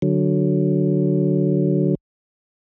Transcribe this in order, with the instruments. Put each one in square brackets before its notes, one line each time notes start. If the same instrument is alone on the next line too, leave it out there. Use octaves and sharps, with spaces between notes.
[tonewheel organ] D3 F#3